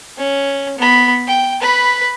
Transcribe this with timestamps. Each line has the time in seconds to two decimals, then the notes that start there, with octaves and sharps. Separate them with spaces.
0.18 C#4
0.78 B3 B5
1.28 G5
1.61 B4 B5